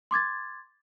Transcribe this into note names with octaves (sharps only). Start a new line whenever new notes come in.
C6 D6 G#6 A6